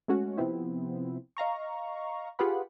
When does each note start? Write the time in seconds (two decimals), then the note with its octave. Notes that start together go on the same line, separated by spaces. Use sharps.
0.08 G#3 A3 C#4 F#4
0.37 C3 F3 B3 C4 E4
1.37 D#5 F5 A#5 C#6
2.39 F4 G4 G#4 B4 F#5 B5